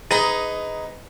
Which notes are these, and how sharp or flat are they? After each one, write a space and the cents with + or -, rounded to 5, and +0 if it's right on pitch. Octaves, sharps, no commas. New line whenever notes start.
D#4 +10 G#4 +0 B4 +25